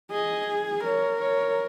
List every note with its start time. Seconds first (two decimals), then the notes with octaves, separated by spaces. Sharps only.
0.11 G#4 D#5
0.84 A#4 C#5
1.20 C#5